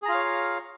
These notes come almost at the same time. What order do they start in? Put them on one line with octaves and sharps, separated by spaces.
G#4 A#5 F4 F5 C#5